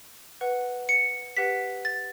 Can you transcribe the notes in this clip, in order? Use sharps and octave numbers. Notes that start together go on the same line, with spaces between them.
B4 F#5
C#7
G4 B4 F#5 B6
A6